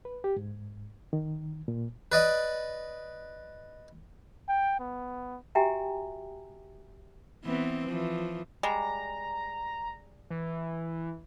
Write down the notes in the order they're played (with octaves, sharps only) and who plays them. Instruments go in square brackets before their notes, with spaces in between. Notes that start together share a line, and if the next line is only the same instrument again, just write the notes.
[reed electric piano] B4
G4
G#2
D#3
A#2
[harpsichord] B4 D5 D#5
[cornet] G5
B3
[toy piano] F#4 G4 E5 G5 G#5 A#5
[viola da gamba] E3 B3 C4
E3 F3
[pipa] G3 G#3 [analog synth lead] A#5
[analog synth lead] E3